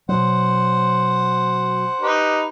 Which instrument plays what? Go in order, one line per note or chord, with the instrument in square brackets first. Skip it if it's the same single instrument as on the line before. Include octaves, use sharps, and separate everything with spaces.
[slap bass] B2 F#3 [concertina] C5 F#5
[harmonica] D#4 G4 B4